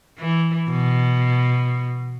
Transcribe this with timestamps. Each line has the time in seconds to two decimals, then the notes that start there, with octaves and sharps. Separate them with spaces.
0.19 E3
0.70 B2